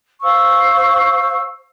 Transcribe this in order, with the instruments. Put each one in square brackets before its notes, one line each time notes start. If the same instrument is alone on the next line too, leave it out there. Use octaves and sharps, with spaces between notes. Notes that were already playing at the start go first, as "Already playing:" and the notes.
[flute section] C5 F5 C#6 E6